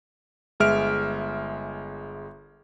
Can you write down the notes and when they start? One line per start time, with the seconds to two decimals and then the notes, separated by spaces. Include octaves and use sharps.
0.60 G1 G#3 E5 F6 D7